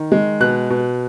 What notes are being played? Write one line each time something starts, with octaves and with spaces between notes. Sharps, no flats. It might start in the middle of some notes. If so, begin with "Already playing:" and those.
Already playing: D#3
G#3
B2 F#6
B2